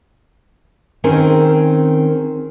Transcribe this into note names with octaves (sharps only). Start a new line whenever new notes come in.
D#3 C4 C#4 G#4 A#4